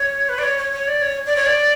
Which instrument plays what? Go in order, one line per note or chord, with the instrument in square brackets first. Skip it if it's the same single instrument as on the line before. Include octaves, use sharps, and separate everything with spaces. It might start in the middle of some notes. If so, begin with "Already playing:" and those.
Already playing: [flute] C#5
B4
D5
C#5
C#5
C#5
D5
C#5
D5
C#5
D5